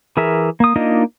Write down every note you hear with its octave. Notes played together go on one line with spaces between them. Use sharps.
E3 G#4 A#4 E5
A#3 D#6
A#3 D4 D#4 F4 D#5